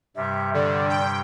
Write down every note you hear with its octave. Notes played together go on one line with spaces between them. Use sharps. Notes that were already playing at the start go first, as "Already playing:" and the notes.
G2 C3 G3 E5
D3 D5
G5